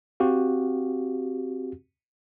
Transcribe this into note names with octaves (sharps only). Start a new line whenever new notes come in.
C4 F#4 G4 F5